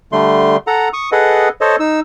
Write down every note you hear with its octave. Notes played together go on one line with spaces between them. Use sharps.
D3 G3 A3 C6
A4 F#5 A#5
C#6 D#6
G#4 A4 B4 D#5 F#5
A4 C5 C#5 D#5
D#4 E6